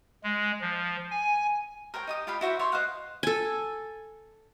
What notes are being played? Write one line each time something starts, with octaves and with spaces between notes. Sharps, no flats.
G#3
F3
G#5
A#4 C5 C#5 G5
D#4 G4 D#6
F4 G4 F5 B5
E4 F#4 C5 E5
C#5 E5 C6
C5 D#5 F5 F#5
A4 G#5